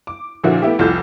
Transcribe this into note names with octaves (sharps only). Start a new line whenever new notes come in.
D6
A#2 D3 F3 A#3 E4 F#4
A3 B3 E4 G4
F1 C2 F4 A4 G6